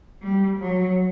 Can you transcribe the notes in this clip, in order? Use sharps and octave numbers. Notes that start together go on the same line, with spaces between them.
G3
F#3